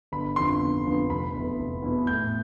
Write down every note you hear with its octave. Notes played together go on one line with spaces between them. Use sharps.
G1 B5
F2 D3 F3 B3 C6
G1
F2 D3 F3 B3
F1 B5
E2 B2 B3 E4
F1
E2 B2 B3 E4
A2 G6